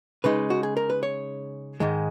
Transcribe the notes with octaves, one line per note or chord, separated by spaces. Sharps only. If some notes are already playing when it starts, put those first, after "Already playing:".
C#3 G#3 D#4 B4
F#4
G#4
A#4
B4
C#5
G#2 D#3 G#3